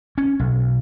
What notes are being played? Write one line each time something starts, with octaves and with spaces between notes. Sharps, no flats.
C#4
B1